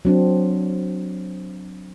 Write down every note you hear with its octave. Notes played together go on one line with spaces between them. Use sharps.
F#3 C4 D4